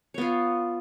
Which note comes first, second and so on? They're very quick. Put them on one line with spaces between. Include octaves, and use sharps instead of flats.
C#5 B3 F4